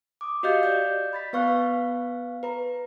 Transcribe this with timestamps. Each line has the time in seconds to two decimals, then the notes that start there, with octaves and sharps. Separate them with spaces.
0.21 D6 D#6
0.43 F#4 G4 D#5 F5 G6
0.63 D5 G6
1.13 B5 A6 B6
1.33 B3 B4 F5 C#6 F6 F#6
2.43 B4 A#5